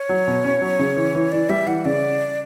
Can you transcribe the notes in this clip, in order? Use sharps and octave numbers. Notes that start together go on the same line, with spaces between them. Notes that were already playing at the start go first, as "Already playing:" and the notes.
Already playing: C#5
F#3
B2
C#4
F#3
C#3
E3
E3
E3 D5
G3 E5
E3 F#5
C#3 D5